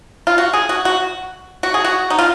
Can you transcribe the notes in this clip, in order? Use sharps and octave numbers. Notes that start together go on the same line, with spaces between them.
F4
F#4
G#4
F#4
F#4
F#4
G#4
F#4
D#4
F4